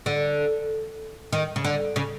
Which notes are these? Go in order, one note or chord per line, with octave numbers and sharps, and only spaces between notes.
D3
D#3
C#3
D3
C#3